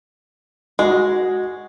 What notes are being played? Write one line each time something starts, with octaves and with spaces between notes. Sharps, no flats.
G#3 F#4